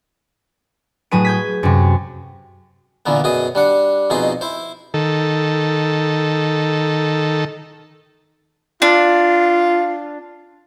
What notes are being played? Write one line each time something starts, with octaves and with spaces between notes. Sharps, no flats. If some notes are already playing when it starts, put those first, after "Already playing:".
A2 F#3 G#4 B4 D#7
G6 G#6 B6
F#2 C3
A#2 D3 E3 A#3 B3
F#2 B2 G#4 D#6
G3 D4 F#5
F2 B2 D#4 G#4 C6
E4 C5
D#3 A4
D4 F4